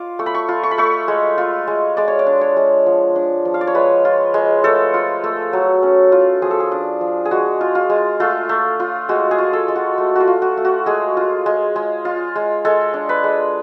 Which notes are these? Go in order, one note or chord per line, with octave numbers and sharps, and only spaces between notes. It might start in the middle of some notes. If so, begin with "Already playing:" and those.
Already playing: F4 D6
A3 C#6
B5
C#6
F4
C#6
B5
A3 C#6
G#3
F4
G#3
G#3 D5
C#5
D5
D4
C#5
G#3
F3
D4
F3
F5
D5
C#5
G#3 B4
F4
G#3
A3 A4
F4
A3
F#3
C#4
F4
F3 G#4
A4
G#4
D4
F3
G#4
G#3 F#4
F4
F4
G#3
A3 F4
A3
F4
G#3 F#4
G#4
F4
A4
G#3
F#4
A3
F4 F#4
F4
F#4
A3
F#4
G#3 G#4
F4
G#3
G#3
F4
G#3
G#3 A4
D4
B4
G#3